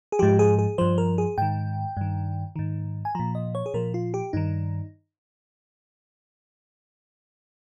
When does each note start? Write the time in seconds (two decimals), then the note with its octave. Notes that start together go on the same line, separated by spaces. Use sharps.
0.12 G#4
0.19 G#2 F3 G4
0.39 G#4
0.59 G#4
0.78 G2 F3 C5
0.98 A#4
1.18 G#4
1.38 G#2 D#3 G5
1.97 G2 D#3
2.56 G#2 D#3
3.05 G#5
3.15 A#2 F3 A#5
3.35 D#5
3.55 C#5
3.66 G#4
3.74 A#2 F3 A#4
3.94 F4
4.14 G4
4.33 G2 D#3 D#4